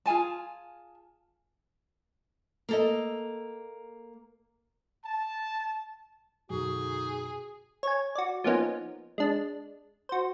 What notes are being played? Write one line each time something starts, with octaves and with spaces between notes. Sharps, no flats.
F4 G#4 G#5 A5
A#3 A4 D#5
A5
F#2 B2 D3 F#3 D#4 F#4 G#4
C#5 G#5
F#4 D5
F3 A#3 B3 C#4 D#4
G#3 D4
F#4 C5